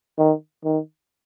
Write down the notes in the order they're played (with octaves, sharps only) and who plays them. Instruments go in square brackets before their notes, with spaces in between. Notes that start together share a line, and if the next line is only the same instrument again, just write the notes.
[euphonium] D#3
D#3